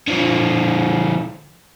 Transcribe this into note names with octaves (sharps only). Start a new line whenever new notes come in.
D3 F3